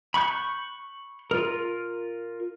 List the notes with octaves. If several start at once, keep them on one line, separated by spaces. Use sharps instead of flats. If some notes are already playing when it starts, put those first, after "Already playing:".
B5 C#6 F#6 G6
F4 A#4